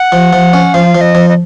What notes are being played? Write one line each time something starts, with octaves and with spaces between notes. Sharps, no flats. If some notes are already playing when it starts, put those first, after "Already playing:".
Already playing: F#5
F3
F3
C#4
F3 F5
F3
D#5
F3
D#5